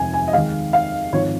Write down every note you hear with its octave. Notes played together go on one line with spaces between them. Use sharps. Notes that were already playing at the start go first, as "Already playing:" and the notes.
Already playing: F1 D#2 D#3 G#3 G#5
G#5
D#5
D#2 D#3 G#3 F5
F5
G#1 G#2 F3 C#5